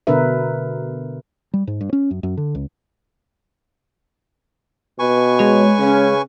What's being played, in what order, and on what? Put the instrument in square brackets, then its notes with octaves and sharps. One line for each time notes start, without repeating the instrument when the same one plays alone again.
[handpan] B2 D3 D4 A#4 B4 E5
[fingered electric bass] G3
G#2
G2
C#4
F#2
F#2
D3
C#2
[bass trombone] B2 [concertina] B4 G#5 C#6
[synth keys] G#3 C#5
[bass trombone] C#3 [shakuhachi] C#4